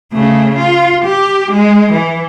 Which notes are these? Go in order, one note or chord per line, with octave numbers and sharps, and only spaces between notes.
C#3 A3
F4
G4
G#3
E3